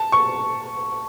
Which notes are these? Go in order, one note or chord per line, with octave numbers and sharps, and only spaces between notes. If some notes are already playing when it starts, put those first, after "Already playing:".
Already playing: A5
C#6